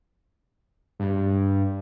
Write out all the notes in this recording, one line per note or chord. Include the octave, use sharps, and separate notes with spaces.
G2